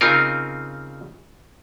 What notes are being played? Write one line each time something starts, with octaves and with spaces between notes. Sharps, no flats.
C#3 C4 D#4 F4 A#4